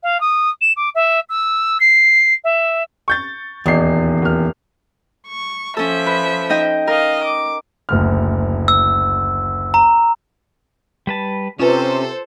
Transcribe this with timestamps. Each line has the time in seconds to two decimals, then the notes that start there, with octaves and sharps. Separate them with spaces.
0.03 F5
0.20 D#6
0.61 E7
0.76 D6
0.95 E5
1.29 E6
1.80 C7
2.44 E5
3.08 C#6 G6 A6
3.66 D#1 E2 D#4 C7
4.22 D#1 F6
5.27 C#6
5.77 F3 C#4 A4 E5
6.06 B4
6.50 D#4 D#5 G5
6.87 A#4 D#5 F5
7.24 D6
7.89 F#1 D2 F6
8.68 E6
9.74 A#5
11.07 G3 B4 A5
11.59 C3 C#4 F4 A4 B4 C5